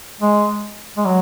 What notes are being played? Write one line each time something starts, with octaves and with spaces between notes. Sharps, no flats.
G#3
G#3
F#3